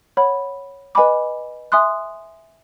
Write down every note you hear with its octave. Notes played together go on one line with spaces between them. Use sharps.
C#5 F#5 B5
B4 D#5 G#5 B5 D6
E5 G#5 C6 D#6 F#6